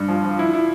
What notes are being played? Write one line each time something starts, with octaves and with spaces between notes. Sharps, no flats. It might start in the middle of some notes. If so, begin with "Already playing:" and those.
Already playing: G2
F3
F3
E4
E4